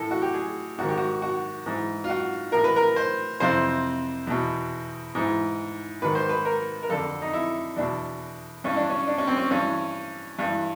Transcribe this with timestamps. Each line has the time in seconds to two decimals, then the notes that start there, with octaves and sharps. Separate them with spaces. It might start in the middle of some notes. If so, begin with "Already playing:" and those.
Already playing: A2 E3 A4
0.11 F#4
0.22 G4
0.34 G#4
0.79 G#2 D#3 F#4
0.89 G4
0.98 F#4
1.22 F#4
1.66 G#2 E3
2.04 F4
2.09 F#4
2.52 A2 E3 A#4
2.64 B4
2.76 A#4
2.96 C5
3.40 F2 C3 E3 C5
4.27 E2 B2
5.15 G#2 E3
6.02 G#2 D#3 B4
6.15 C5
6.29 B4
6.45 A#4
6.83 A#4
6.89 F2 D3 A4
7.22 D#4
7.33 E4
7.76 E2 B2 D4
8.64 G2 E3 C#4
8.76 D4
8.90 C#4
9.07 D4
9.18 C#4
9.27 C4
9.37 C#4
9.51 G2 E3 C#4
10.39 G2 E3